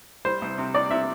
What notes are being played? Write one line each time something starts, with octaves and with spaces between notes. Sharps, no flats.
G3 C5
C2
C3
C3 D5
C3 E5